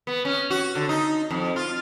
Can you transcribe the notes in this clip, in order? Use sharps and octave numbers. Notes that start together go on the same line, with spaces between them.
B3
C#4
F#4
D3
D#4
F2
F4